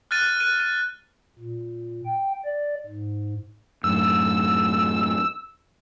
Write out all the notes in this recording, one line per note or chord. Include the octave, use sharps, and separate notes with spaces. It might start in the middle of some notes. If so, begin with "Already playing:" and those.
F6 F#6 A6 D#7
F#6 D#7
D#7
A#2
G5
D5
G#2
F#2 A2 E6